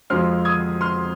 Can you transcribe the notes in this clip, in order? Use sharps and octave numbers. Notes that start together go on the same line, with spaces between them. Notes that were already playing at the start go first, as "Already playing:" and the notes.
F2 F3 G#3 C4 C6 F6
D#6 G#6
C6 F6